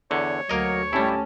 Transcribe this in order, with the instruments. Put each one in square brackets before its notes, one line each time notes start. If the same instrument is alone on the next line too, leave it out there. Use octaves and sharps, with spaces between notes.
[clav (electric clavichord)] E2 D3 [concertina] C#5 C#6
[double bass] D2 [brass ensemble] F#3 [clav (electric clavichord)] A#3 A#4 D#5
[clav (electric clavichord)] G3 E4 [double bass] A3 C#4 [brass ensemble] G4 G#5 A5